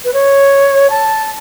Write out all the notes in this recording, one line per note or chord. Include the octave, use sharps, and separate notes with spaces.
B4
C#5
A5